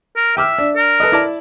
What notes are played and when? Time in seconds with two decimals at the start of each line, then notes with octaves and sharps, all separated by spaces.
0.17 A#4
0.37 E5 G5 D6 F6
0.58 D4
0.76 A#4
1.00 A4 B4 D#5
1.12 E4 D5 A5